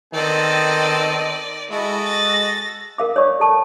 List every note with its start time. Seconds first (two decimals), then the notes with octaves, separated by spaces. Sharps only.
0.13 D#3 B3 C4 A4 D5 D#5
1.70 G#3 E4 F#4 A4 D#5
2.06 A6 A#6
2.98 A#4 F5 D6
3.16 C#5 D5 C#6
3.40 A4 A5 C#6